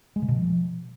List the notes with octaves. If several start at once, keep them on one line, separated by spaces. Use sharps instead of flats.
G#3
C#3
B2
F3